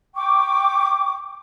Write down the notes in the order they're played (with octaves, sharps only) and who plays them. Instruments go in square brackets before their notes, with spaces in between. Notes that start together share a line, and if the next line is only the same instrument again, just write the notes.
[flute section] G5 C#6 D6